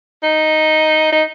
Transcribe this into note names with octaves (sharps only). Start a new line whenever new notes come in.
D#4
D#4